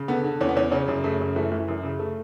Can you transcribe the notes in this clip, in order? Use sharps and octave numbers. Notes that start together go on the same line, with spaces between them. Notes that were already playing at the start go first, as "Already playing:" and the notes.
Already playing: C#3
D3 B3
D3
E2 C#4
B3
E2 C#4
C#3 C#4
F#2
C#3 A3
F#2
E3 A3
E3
F#2
C#3
A3